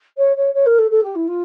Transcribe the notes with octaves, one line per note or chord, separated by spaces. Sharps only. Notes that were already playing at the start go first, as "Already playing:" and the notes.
C#5
C#5
C#5
A#4
A4
A4
G4
E4
F4